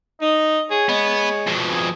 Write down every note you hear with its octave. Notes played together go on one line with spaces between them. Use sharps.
D#4 D#5
G#4 C#5
G#3 B3
F2 B2
G#4